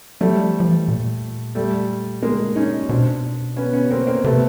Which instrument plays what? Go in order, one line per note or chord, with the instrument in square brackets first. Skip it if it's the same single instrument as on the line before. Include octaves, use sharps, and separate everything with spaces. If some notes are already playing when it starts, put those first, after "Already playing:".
[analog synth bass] F#3 [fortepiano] G3 A3
[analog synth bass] F3
F3
E3
A#2
[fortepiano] G3 A3
G#3 A#3
C#4 D#4
[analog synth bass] B2 [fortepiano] C4 D4
[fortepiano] B3 C#4
B3 C#4
A#3 C4
A#3 C4
[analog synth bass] C3 [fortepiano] A3 B3